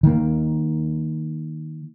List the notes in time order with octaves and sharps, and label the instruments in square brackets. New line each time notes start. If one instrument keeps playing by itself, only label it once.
[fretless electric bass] D#3 A#3